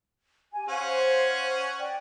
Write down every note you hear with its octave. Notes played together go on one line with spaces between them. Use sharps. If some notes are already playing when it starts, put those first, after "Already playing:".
G4 G#5
C#4 C5 F5 F#5 G#5
D5 G5